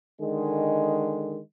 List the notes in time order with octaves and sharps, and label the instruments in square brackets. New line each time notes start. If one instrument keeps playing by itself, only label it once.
[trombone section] D3 D#3 G#3